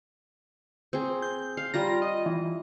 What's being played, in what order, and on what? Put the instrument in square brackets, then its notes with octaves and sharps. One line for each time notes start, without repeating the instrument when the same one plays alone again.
[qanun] C4 G#4
[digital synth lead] G6
[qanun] F5
[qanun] G3 F4 A#5 [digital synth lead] A#6
[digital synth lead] D#5
E3